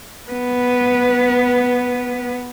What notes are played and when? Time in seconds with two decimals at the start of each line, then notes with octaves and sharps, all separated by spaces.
0.30 B3 B4